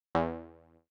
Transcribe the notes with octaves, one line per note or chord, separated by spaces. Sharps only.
E2